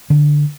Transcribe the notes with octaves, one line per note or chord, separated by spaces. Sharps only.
D3